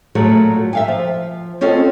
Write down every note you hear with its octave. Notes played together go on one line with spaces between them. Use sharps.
A#2 F#3 G#3 A3
E5 F5 G#5
F3
C4 C#4 F4 A4 D#5